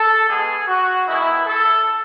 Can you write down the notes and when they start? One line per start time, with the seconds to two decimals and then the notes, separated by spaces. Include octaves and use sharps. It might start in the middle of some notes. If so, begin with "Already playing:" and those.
Already playing: A4
0.28 B2 G#3 B3 G#4
0.68 F#4
1.07 D#3 G#3 B3 E4
1.47 A4